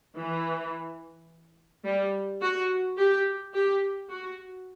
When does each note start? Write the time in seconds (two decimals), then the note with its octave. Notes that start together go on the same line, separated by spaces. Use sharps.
0.18 E3
1.85 G3
2.42 F#4
2.98 G4
3.54 G4
4.09 F#4